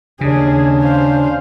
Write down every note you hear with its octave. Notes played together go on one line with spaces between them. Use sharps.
D#2 C#3 C#4 D4 G#4
C5 F5